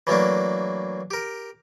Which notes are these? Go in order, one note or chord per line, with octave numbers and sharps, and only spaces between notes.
E3 F#3 A3 A#3 D4
G4 A#4